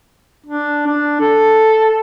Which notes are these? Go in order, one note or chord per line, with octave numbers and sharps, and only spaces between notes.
D4
D4
A4